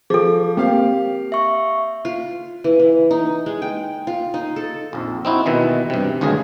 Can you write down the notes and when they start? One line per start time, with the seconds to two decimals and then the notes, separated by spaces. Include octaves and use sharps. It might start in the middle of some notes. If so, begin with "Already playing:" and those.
0.10 F3 G#4 A4
0.57 A#3 C4 G4 F5
1.32 E5 C#6
2.05 F4
2.64 E3
2.80 E3
3.11 D#4
3.46 G#3
3.62 G5
4.07 F4
4.34 D#4
4.56 A4
4.93 A#1 F2
5.25 C4 D#4 E4 F#4
5.46 D#2 B2 D#3 E3
5.90 G2 C3
6.21 G#1 D2 G2 C#3 G#4